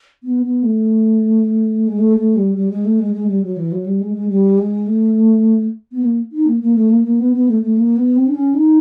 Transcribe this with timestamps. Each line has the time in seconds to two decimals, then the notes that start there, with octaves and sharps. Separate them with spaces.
0.23 B3
0.43 B3
0.63 A3
1.87 G#3
1.98 A3
2.17 A3
2.36 G3
2.55 G3
2.70 G#3
2.85 A3
2.99 G#3
3.13 G#3
3.28 G3
3.43 F#3
3.56 E3
3.72 F#3
3.86 G3
4.00 G#3
4.14 G#3
4.29 G3
4.58 G#3
4.87 A3
5.92 B3
6.03 A#3
6.32 D#4
6.46 A#3
6.61 A#3
6.76 A3
6.90 A#3
7.04 A#3
7.20 B3
7.34 B3
7.49 A3
7.62 A3
7.77 A#3
7.97 B3
8.16 C4
8.27 D4
8.35 C#4
8.54 D#4